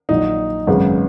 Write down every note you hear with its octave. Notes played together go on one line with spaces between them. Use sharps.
A#1 A#2 F#3 D#4
G#1 F#2 C#3 G#3 B3